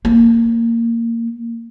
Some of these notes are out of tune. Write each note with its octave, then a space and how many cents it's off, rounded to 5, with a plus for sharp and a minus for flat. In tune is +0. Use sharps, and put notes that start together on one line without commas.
A#3 -15